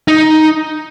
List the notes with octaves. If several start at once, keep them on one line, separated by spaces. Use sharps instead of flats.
D#4